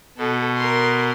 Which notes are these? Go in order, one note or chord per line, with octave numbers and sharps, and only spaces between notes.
B2 A4
A#4 C6